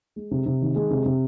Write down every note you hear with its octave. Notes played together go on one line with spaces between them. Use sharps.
G#3
C3
C3
D#3
G#3
C3
C3